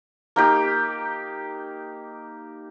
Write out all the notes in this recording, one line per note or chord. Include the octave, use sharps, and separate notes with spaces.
A#3 D#4 G4